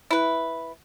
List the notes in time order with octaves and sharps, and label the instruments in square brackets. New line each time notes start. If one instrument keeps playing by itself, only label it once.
[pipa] E4 B4